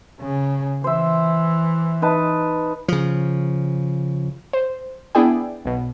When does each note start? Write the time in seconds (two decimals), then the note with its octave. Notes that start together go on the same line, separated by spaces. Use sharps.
0.21 C#3
0.84 E3 C5 E5
2.02 D#4 B4 A5
2.88 C#3 F3
4.53 C5
5.15 B3 D4 E4 G#4 D5 G5
5.65 B1 B2